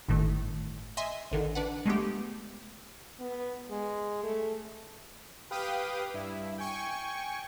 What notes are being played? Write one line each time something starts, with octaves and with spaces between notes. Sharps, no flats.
G1 A2 D#3 A3
D#5 E5 G#5 C6
A1 D3 D#3
D4 B4 F#5
G#3 A3 B3 G4
B3
G#3
A3
G4 B4 F5 G5 D#6
G2 E4
G5 G#5 C#6